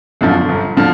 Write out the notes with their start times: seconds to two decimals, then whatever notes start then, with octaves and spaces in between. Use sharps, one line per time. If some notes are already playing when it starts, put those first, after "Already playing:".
0.21 F#2 D3 F3
0.48 G1
0.77 D3 F3